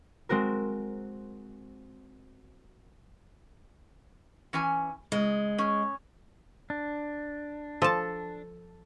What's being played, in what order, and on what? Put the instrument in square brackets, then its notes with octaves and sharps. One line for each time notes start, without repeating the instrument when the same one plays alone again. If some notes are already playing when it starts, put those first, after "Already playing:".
[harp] G#3 C4 F#4 A#4
[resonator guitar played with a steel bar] E3 C#4 G#5
[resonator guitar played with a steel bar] C#3 [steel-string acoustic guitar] G#3
[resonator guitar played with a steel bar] C#4
[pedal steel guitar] D4
[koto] F3 A5 [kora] A4